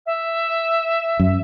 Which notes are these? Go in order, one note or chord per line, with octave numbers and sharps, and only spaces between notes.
E5
F#2